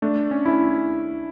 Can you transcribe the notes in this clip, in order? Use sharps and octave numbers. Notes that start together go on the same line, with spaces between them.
A3 D4
C#4
E4